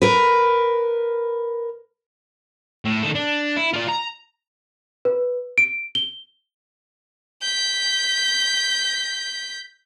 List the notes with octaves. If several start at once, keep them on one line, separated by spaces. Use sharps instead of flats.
A#4 B4
A2
D#3 A4
D4
E4
F4 D5
A#5
B4
D7
G7
G6 B6